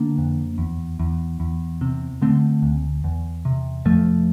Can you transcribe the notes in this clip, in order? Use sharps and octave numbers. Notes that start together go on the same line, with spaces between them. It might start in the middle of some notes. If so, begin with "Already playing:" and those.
Already playing: D3 A#3 D4
F2
E2
E2
E2
C3
D3 A3 C4
D2
E2
C3
F2 F3 A3